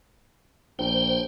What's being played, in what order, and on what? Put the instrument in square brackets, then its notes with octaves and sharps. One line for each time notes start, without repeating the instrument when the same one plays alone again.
[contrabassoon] A#1 [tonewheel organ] C5 G5